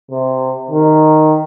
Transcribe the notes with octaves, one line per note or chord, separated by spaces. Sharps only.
C3
D#3